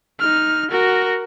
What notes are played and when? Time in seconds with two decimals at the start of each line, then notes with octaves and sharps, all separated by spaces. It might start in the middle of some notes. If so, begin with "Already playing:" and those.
0.20 D#4 F6
0.71 F#4 A#4